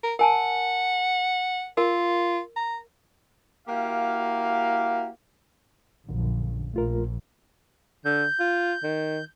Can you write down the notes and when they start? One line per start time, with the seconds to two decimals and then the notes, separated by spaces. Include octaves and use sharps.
0.03 A#4
0.19 A#4 F#5 G#5 A5
1.77 F4 A#4
2.56 A#5
3.68 A#3 E4 F#4 G4 F5
6.09 A#1 F#2 D3
6.74 A#1 A3 F4 A#4
8.05 D3 G6
8.40 F4
8.83 D#3